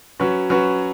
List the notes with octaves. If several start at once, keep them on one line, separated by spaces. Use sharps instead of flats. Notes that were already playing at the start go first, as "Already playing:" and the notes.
F#3 C#4 F#4 B4
F#3 C#4 F#4 B4